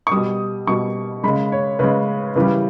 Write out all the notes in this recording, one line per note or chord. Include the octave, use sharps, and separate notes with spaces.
C#6
B2 G3 D#6
B2 G3 C#6
C#3 G#3 B5
C#5
C#3 G#3 B4
C#3 E3 G3 B4